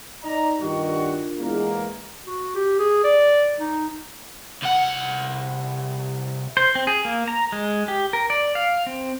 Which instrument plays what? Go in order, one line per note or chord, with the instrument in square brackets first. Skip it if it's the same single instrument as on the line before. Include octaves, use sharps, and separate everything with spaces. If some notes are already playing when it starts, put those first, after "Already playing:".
[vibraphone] D#4 [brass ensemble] D5 D#5 A#5
[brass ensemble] G2 D#3 F#4 [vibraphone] D4 F4 A#4
[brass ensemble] E2 G#3 A#3
[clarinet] F#4
G4
G#4
D5
D#4
[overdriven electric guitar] C2 F#5
[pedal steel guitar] C5
C4
G#4
A#3
A#5
G#3
G4
A#4
D5
F5
C4